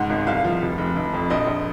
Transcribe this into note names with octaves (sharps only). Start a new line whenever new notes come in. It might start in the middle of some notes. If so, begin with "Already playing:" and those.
Already playing: C#2 G#2 F#5
G#1
C2 F5
F3
F1
F1
F1
F2
A#1 D#5
A#1